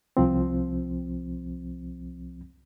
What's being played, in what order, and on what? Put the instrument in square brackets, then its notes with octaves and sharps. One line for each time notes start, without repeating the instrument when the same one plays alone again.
[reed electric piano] C2 F3 C4